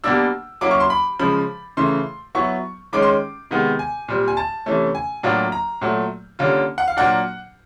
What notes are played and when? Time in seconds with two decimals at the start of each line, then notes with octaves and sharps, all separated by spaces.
0.04 B2 G3 A#3 D4 E6
0.61 F#3 A#3 C#4 E4 D6
0.71 C#6
0.80 C6
0.90 B5
1.19 C#3 F3 G#3 B5
1.77 C#3 E3 A3 C6
2.35 F#3 B3 E4 C#6
2.93 D#3 G#3 C#4 D6
3.02 C6
3.51 C3 D#3 G#3 B3
3.79 G#5
4.08 A#2 G3 C4
4.28 G#5
4.37 A5
4.66 C3 E3 A3 C#4
4.95 G#5
5.23 A2 F#3 A#3 D4 F4
5.52 A#5
5.81 A#2 F#3 A3
6.39 D3 G3 A#3 C#4 F4
6.78 F#5
6.88 F5
6.97 A#2 F#3 A#3 D4 F#5